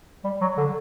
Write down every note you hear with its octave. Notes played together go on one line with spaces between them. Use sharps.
G3
F#3
D3